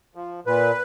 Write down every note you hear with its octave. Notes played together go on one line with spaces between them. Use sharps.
F3
A#2 B4